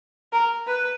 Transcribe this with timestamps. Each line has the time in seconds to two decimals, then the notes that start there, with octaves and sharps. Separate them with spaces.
0.33 A#4
0.67 B4